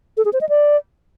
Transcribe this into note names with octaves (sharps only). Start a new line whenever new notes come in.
A4
G#4
C5
D#5
D5